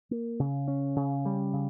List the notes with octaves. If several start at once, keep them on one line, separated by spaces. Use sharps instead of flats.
A#3
C#3
C#4
C#3
G3
C#3